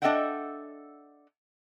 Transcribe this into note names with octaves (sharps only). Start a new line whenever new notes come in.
D4 A4 D#5 E5 F#5 G5